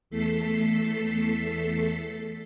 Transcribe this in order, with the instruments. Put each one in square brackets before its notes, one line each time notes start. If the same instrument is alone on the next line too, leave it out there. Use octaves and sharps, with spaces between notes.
[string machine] E2 A3 A4 B6 C7